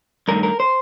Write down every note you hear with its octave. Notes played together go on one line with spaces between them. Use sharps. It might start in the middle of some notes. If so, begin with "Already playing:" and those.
G2 D#3 A3 A#4
A#4
C5